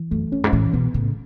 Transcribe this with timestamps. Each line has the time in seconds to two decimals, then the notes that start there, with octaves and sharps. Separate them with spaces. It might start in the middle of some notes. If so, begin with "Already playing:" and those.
Already playing: E3
0.11 F#2 A3
0.32 E2 C#4
0.44 G#2
0.52 A2 E3
0.73 B2 B3
0.94 A2 C#3